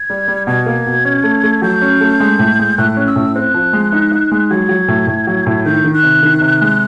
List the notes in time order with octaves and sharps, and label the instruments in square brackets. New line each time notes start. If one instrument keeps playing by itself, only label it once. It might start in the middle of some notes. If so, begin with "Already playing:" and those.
Already playing: [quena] G#6
[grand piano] G3
G3
[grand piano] B2 [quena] G#6
[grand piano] A#3
B2
C#4
A3
A3
[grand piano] F#3 [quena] G6
[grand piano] C#4
A3
G#3
A2
G#3
[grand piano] A2 [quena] F#6
[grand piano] C#4
[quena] E6
[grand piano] A2
[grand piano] C4 [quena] F#6
[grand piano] F3
G#3
D#4
D#4
G#3
[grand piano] F#3 [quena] G#6
[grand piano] F#3
A2
A2
F#3
A2
[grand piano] D#3 [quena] G6
[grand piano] D#3
[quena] F#6
[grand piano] C3
D#3
C3
G#3